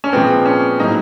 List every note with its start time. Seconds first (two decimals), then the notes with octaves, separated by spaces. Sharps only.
0.04 C#4
0.13 A#2 F3 G#3 B3 C4
0.45 C#4
0.79 A2 F#3 A#3 D#4